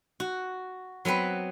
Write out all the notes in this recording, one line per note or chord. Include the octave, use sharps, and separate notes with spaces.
F#4
F#3 B3 C4 B4